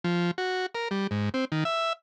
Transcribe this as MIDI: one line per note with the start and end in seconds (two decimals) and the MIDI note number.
0.04 0.31 53
0.38 0.66 66
0.75 0.88 70
0.91 1.07 55
1.11 1.29 44
1.34 1.45 60
1.52 1.64 51
1.65 1.93 76